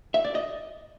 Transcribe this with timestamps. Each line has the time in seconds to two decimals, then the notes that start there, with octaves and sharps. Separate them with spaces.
0.14 E5
0.25 D5
0.35 D#5